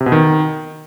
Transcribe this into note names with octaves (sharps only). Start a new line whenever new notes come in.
C3
B2
D#3